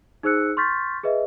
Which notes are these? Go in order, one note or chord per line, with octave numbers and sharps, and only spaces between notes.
D#4 G#4 C5 E6 F#6 C#7
C6 C#6 F6 G6 A6 B6
G#4 B4 D#5 E5